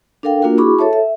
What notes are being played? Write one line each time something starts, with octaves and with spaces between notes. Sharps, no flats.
D4 A4 A#4 F5 G5
A#3 D4 F4 F#4 A#4
E4 F#4 G#4 B5 C#6 D6
A4 C#5 E5 A5
E5